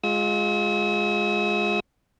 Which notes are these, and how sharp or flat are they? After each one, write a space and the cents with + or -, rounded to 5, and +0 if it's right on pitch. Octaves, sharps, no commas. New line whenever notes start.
G#3 +0 F4 +20 E6 -45